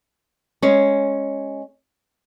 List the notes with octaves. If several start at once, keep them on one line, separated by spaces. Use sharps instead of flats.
G#3 C#4